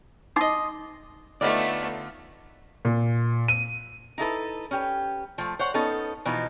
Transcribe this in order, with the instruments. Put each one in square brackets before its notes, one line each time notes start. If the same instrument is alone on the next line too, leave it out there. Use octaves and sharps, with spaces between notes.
[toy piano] D#4 D6 [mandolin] D#5 C6
[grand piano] D3 D#4 F4 [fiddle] A3 B3 [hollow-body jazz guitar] D5
[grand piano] A#2
D#7
[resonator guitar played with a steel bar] D#4 E4 A4 B4
C#4 G4 B4
F3 A3
C5 C#5 F#5
B3 C#4 D#4 A4
B2 E3 F3 D#4